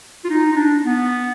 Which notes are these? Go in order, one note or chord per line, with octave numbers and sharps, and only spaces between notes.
F4
D#4
D#4
D4
B3